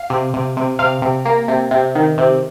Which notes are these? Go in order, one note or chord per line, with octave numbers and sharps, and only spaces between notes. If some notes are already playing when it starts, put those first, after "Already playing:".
Already playing: F5
C3
C3
C3
C3 F5
C3
A#3
C3
C3
D#3
C3